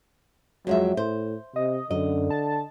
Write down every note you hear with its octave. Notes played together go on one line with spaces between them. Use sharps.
F2 F#3 G#3 E5
A2 C5
C3 D#5
F#2 D3 D#5
A5